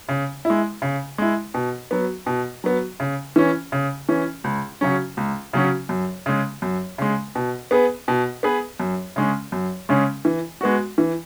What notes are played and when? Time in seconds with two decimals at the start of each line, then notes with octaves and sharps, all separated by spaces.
0.09 C#3
0.45 E4
0.50 G#3
0.82 C#3
1.18 G#3 E4
1.54 B2
1.91 F#3 B3
2.26 B2
2.64 F#3 B3
3.00 C#3
3.36 E3 C#4
3.72 C#3
4.09 E3 C#4
4.44 C#2
4.81 C#3 F#3 C#4
5.17 C#2
5.53 C#3 F#3 C#4
5.89 F#2
6.26 C#3 G#3
6.62 F#2
6.98 C#3 G#3
7.35 B2
7.71 B3 G#4 B4
8.08 B2
8.43 B3 G#4 B4
8.80 F#2
9.16 C#3 G#3 C#4
9.52 F#2
9.89 C#3 G#3 C#4
10.25 E3
10.61 G#3 B3 F#4
10.98 E3